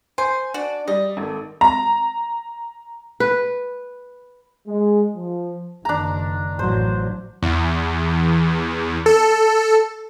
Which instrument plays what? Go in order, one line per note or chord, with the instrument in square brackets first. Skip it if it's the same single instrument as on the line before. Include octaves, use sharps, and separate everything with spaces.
[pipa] C5 [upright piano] G#5
[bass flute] D4 [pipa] F#4 D5
[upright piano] G3 [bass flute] D5 [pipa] D#5
[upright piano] G#1 [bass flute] A4
[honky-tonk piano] A#5
[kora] B4
[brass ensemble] G#3
F3
[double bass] F#1 D#3 [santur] D4 A#5
[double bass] A1 F#3 [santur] C5
[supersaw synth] E2
A4